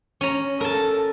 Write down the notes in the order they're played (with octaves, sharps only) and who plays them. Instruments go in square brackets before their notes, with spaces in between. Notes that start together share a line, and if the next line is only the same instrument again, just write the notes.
[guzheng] C#4 A#5
[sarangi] A4 [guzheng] A#4 A5